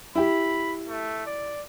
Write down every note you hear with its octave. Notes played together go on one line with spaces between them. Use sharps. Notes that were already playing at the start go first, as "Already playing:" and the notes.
E4 G4 B5
A3
D5